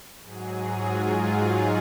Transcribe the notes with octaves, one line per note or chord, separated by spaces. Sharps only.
G#2 F#3 G#4
F4
D#4